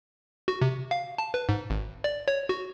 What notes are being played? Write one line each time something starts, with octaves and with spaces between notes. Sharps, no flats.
F#4
C3
F5
A5
B4
G#2
G#1
D5
C#5
F#4